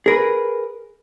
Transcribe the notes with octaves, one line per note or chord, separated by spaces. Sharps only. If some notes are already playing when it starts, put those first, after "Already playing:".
G#4 A#4 B4